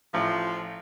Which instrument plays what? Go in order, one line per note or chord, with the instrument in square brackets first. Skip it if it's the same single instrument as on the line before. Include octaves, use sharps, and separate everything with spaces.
[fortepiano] A1 [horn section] F3